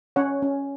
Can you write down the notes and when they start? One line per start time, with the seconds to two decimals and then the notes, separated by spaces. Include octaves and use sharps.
0.16 C#4 C#5 F#5
0.42 C#4